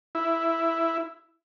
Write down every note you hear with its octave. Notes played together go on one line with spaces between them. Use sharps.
E4